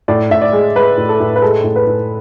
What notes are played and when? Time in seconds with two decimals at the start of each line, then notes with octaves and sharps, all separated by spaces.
0.08 A2 D5
0.31 A2 E5
0.42 D5
0.53 G#3
0.76 G#3 B4
0.97 A2
1.09 A4
1.20 A2
1.36 B4
1.42 G#3 A4
1.64 A2
1.76 B4
1.87 A2